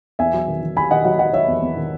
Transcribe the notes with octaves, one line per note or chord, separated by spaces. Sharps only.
E2 E5 G#5
F#3
D#3
D#3
D#3 G#5 B5
D#3 D#5 F#5
F#3 D#5 F#5
F#3 D#5 F#5
F#3 C#5 E5
E2
E2
D#3